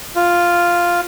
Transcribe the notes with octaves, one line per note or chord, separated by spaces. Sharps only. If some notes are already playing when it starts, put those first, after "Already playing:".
F4